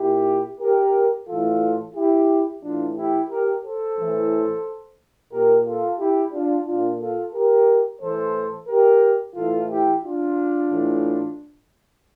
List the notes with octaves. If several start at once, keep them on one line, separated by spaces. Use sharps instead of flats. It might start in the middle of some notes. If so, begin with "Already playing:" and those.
Already playing: A#2 E4 G4
G4 A#4
A2 E3 F4 A4
E4 G4
A2 E3 D4 F4
E4 G4
G4 A#4
A4 C5
A2 E3
A#2 G4 A#4
F4 A4
E4 G4
D4 F4
A#2 D4 F4
F4 A4
G4 A#4
A2 E3 A4 C5
G4 A#4
A2 E3 F4 A4
E4 G4
D4 F4
A2 E3